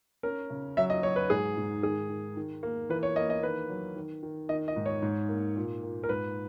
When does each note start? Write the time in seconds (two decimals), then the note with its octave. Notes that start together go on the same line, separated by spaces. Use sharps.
0.23 C#4 A#4
0.50 C#3
0.77 F#3 E5
0.90 D#5
1.03 F#3 C#5
1.16 B4
1.30 G#2 G#4
1.57 G#2
1.83 D#3 G#4
2.09 D#3
2.37 D#3
2.63 A#3
2.89 E3 B4
3.03 C#5
3.16 A#3 D#5
3.30 D#5
3.43 D#3 B4
3.69 F#3
3.96 D#3
4.23 D#3
4.49 D#3 D#5
4.68 D#5
4.76 G#2
4.86 C#5
5.02 G#2
5.29 A#3
5.56 A#2
5.83 A#2
6.04 A#4
6.09 G#2 B4